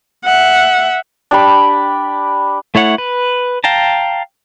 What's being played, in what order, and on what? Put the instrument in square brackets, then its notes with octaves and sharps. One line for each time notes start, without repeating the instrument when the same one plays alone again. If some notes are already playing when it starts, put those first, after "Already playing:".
[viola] E5 F#5
[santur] D4 G4 B5
[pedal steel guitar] A3 E4 C#5 F#5
B4
F5 G5 A5 A#5